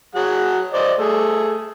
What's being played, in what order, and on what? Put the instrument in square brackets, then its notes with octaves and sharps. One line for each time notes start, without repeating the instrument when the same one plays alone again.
[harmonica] F#3 G#4 F#5
C5 D5 D#5
A3 G#4